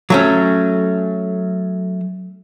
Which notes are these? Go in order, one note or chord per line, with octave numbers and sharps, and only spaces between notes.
F#3 A3 C#4